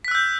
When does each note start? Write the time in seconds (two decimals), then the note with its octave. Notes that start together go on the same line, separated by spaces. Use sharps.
0.05 B6
0.08 F#6
0.11 E6
0.15 G6